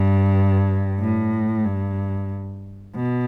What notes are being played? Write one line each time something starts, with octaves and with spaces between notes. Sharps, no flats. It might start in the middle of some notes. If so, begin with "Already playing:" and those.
Already playing: G2
A2
G2
B2